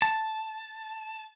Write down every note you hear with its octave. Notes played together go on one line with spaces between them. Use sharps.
A5